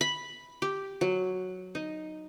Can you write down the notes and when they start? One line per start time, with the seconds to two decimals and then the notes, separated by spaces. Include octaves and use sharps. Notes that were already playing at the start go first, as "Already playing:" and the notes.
0.01 B5
0.62 G4
1.01 F#3
1.75 D#4